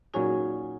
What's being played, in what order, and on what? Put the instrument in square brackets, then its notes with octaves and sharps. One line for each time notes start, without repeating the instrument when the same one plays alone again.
[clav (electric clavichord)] A#2 F#3 C#4 G#4 C#5 [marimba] D#4 F#4